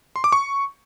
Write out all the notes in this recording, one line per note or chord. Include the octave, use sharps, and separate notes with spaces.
C6
D6
C#6